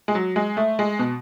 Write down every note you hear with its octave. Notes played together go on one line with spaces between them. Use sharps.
G#3
F#3
G#3
A3
G#3
B2